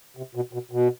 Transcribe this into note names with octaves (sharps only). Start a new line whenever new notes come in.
C3
B2
B2
B2